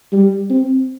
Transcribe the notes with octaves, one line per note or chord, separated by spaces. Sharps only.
G3
C4